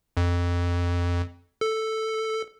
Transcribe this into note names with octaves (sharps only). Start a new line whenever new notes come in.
F2
A4